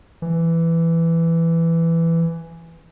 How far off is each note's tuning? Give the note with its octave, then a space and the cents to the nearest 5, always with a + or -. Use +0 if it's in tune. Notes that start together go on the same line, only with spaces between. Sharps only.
E3 +10